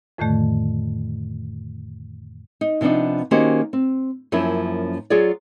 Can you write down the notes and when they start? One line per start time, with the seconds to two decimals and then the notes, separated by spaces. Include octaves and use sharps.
0.18 F2 A2 D3 D#3 A3
2.61 D#4
2.81 C3 F3 B3 D4 D#4
3.31 D#3 A#3 C#4 F#4 G4 C5
3.73 C4
4.32 F#2 F3 A#3 C#4 E4
5.10 F#3 F4 G#4 C#5 D5